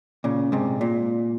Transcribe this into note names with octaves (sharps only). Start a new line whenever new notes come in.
A#2 C#3
G#2 C3
A#2